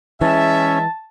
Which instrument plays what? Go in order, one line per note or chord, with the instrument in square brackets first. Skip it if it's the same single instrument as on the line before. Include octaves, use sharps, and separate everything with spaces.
[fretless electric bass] E3 [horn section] G#3 E5 [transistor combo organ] C#4 [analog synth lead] A5